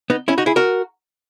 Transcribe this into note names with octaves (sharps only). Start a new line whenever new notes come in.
B3 D#4
C#4 E4
D#4 F#4
E4 G#4
F#4 A#4